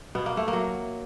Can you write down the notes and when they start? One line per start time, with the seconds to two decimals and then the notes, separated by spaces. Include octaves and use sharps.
0.15 B2 B3
0.26 A#3
0.37 A3
0.48 A#3
0.53 F#3